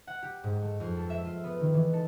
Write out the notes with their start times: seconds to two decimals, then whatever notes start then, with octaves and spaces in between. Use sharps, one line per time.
0.07 F#5
0.23 G4
0.44 G#2
0.62 A3
0.80 F2
0.96 A4
1.10 E5
1.25 F4
1.44 B3
1.60 D#3
1.74 E3
1.93 A4